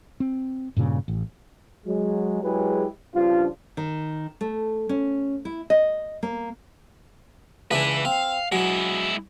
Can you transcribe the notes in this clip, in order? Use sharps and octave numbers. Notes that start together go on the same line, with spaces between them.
C4
G2 A#2 C#3
A1
F#3 G#3
F#3 G#3 E4 G4 G#4 B4
G2 C#3 F3 D4 F4
D#3
A3
C#4
E4
D#5
A#3
C#2 E3 D4 B4 E5
C4 F5
F#3 G#3 E4